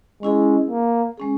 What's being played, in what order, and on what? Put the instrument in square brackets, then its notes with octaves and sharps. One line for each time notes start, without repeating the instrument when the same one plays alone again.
[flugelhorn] G#3 [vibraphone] C#4 E4 G#4
[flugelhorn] A#3
[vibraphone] G#3 C#4 G#4